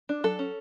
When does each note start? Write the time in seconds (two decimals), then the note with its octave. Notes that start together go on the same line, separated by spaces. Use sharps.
0.09 D4
0.24 F#3 A4
0.39 C#4